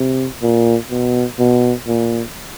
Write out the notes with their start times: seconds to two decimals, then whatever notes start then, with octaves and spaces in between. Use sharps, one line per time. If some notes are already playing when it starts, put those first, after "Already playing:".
Already playing: C3
0.42 A#2
0.91 B2
1.39 B2
1.87 A#2